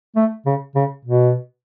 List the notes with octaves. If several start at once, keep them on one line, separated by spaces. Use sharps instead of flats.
A3
C#3
C#3
B2